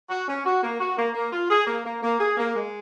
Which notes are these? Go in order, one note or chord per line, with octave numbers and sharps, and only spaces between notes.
F#4
C#4
F#4
A#3
F#4
A#3
A#3
F4
G#4
A#3
A#3
A#3
G#4
A#3
G#3